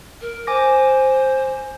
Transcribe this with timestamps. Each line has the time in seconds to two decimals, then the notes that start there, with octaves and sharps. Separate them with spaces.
0.21 A#4
0.47 C5 G#5 D6 A#6